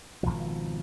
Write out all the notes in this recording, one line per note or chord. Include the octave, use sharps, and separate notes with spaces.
G#1 C#2 B2 F3